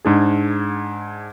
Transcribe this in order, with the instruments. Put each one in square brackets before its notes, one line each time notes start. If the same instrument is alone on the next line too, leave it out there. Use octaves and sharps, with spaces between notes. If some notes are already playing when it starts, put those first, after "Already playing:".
[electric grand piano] G#2 D4 G#4